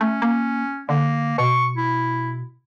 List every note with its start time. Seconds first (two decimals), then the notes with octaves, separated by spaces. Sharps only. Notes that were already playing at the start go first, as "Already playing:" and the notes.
0.01 A3 C#4
0.22 A#3
0.89 D3 A#3
1.38 B2 C#6
1.77 E4